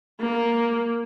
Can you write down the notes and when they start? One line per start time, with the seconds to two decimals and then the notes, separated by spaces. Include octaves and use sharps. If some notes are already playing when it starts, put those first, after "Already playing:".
0.21 A#3